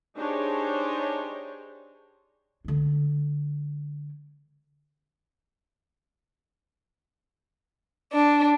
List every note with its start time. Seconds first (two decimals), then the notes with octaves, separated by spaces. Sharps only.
0.16 D4 D#4 G4 G#4 C5 C#5
2.65 D3 G#3
8.13 D4